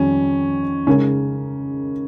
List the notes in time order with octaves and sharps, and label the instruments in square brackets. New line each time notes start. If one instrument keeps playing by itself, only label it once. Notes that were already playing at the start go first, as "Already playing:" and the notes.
Already playing: [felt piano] F2 D#3 G3 [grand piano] C#4
[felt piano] C#3 G#3 D#4 A#4 [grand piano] C#4